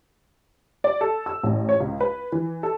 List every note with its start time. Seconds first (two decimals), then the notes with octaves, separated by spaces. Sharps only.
0.84 D5
1.01 A4
1.26 E6
1.43 A1
1.69 C#5
1.80 C#2
2.01 B4
2.32 E3
2.63 A4